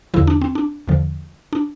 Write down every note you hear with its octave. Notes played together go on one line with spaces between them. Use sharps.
E2 D3 F3 E4
D4
C4
D4
E2 D3 F3
D4